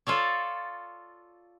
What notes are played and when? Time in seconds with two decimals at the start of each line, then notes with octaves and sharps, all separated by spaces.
0.07 F4 A4 C#5 D5